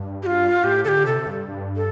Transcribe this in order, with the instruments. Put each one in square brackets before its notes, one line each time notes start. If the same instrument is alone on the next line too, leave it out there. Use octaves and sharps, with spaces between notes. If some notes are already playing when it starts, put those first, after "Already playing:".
Already playing: [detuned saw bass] G2
[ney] G4
F4
[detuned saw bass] A2 [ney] G4
[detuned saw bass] D3 [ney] G4 A4
[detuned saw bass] C3 [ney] A4
[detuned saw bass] G2
G2
[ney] A4